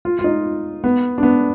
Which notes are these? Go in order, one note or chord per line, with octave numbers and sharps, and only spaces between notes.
F4
F4
D#4
B3
D4
B3